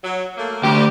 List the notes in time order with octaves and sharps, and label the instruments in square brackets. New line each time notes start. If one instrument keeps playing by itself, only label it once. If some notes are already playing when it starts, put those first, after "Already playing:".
[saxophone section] F#3
A3 A#3
[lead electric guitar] D2 [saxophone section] G4